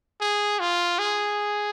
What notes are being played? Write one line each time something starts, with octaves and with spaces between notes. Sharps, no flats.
G#4
F4
G#4